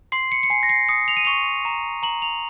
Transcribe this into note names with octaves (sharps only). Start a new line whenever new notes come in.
C6 C7
C#7
C#7
G#5 C7
A#6
C7
D#6 C#7
F7
D#7
C#6 F7
A#5
A#5 F#7
F7